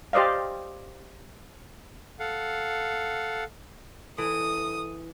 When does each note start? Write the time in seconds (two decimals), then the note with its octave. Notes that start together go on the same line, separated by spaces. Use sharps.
0.13 G4 C5 D5 D#5 F5
2.20 A4 F5 F#5
4.18 E3 A4 D#6